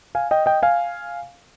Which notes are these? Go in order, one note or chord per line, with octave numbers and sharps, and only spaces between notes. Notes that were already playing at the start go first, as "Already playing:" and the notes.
F5 G#5
D#5 G5
D#5 G5
F5 G#5